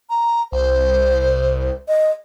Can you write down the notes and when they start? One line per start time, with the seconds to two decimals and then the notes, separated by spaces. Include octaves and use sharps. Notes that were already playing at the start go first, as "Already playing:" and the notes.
0.10 A#5
0.52 C2 C5
1.88 D#5